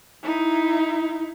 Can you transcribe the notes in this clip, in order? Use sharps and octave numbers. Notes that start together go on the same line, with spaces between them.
D#4 E4